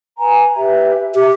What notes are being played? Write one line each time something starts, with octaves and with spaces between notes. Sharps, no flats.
B4 G#5 A#5
G4 B4 E5
G4 E5